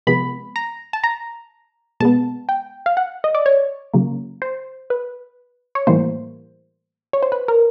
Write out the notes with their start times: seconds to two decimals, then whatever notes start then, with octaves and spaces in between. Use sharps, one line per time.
0.07 C3 F3 G#3 B3 B5
0.56 A#5
0.93 A5
1.04 A#5
2.00 B2 G#3 B3 A5
2.49 G5
2.86 F5
2.97 F#5
3.24 D#5
3.35 D5
3.46 C#5
3.94 C#3 F#3 A#3
4.42 C5
4.90 B4
5.75 C#5
5.87 A2 E3 G3 A#3 C5
7.13 C#5
7.23 C5
7.32 B4
7.48 A#4